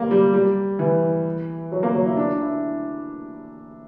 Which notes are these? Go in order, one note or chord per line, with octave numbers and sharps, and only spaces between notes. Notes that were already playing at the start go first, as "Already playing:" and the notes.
Already playing: G3 A#3
G3
G3
E3
F#3
A#3
F#3
E4
D4
E4